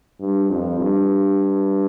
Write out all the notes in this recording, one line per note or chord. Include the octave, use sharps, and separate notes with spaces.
G2
F2
G2